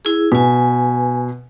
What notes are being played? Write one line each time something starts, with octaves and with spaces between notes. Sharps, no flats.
E4 G#4
B2 B4 G#5